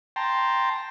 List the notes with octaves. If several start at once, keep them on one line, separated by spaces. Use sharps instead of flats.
G5 A5 A#5 C6